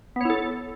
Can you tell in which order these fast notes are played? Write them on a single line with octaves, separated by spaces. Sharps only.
B3 C#5 E4 A4